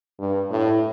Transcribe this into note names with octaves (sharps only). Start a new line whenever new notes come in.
G2
A2